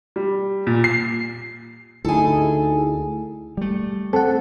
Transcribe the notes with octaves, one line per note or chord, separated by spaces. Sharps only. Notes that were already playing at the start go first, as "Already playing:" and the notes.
G3
A#2
C7
D2 D#4 E4 G#4 A4 G#5
G3 A3
C4 A4 F#5